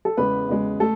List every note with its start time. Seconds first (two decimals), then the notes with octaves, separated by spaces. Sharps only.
0.05 A4
0.17 E2 C#3 G#3 B3 B4
0.49 E2 C#3 G#3
0.80 A3 A4